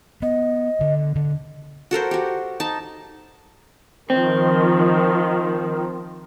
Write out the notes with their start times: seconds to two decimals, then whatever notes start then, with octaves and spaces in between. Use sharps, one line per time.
0.22 B3 D#5
0.81 D3
1.16 D3
1.91 F#4 A4 A#4 C5
2.11 F#4 G4
2.60 D#4 A5
4.10 D#3 F3 C4